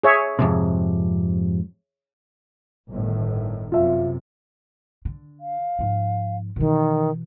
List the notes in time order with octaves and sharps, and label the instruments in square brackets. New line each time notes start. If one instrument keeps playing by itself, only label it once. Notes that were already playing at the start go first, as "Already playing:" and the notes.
[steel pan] G#4 C#5 E5
[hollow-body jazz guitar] F2 G#2 C3
[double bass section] G1 A2 D#3
[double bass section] F#2 C3 [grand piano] F4 E5
[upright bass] D3
[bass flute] F5
[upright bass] G#2 F3
[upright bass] B2 E3 [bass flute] D#3